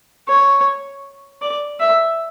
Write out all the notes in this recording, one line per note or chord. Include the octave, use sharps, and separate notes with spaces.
C#5
D5
E5